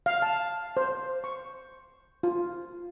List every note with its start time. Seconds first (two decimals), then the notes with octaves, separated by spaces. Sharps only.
0.06 F5
0.22 A5
0.77 C5
1.24 C#6
2.23 F4